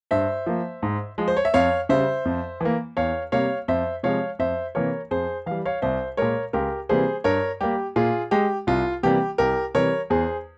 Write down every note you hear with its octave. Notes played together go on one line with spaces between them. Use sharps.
G2 C5 E5
F3 A#3
G#2
F3 G#3
C5
C#5
E5
F2 C#5 F5
C#3 G3 C5 E5
F2
E3 A#3
E2 C#5 F5
C3 G3 A#3 C#5 F5
F2 C5 E5
C3 F3 G#3 C#5 F5
F2 C5 E5
C3 E3 A#3 A#4 C#5
F2 G#4 C5
E3 G3 F5
C#5 F5
C2 C5 E5
A#2 G#3 A#4 C#5
C#2 G4 A#4
C3 E3 G3 A#3 G#4 C5
G2 A#4 C#5
G3 A#3 G4
A#2 F4 G#4
G#3 G4
C2 F4
C3 E3 G3 A#3 G4
C2 G4 A#4
C3 E3 G3 A#4 C#5
E2 G#4 C5